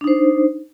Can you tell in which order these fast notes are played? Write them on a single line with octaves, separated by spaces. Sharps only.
D4 D#4 C5